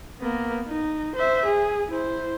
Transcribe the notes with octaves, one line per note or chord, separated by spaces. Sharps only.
A#3 B3
D#4
C5 E5
G#4
E4 C5